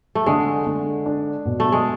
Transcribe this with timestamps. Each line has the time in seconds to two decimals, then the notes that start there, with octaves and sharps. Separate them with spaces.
0.15 A3
0.26 D3 G#3
0.66 D3
1.06 D4
1.45 B2
1.60 A3
1.72 G#3